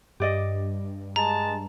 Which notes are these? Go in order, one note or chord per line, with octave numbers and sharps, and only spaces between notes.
G2 G4 D5 D#5
G#3 A5 A#5